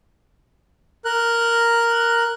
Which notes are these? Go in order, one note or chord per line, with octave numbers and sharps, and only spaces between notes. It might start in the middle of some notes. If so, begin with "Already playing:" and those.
A#4 F#6